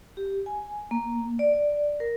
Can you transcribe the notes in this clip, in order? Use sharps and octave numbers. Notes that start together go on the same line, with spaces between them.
G4
G#5
A#3
D5
D5
A#4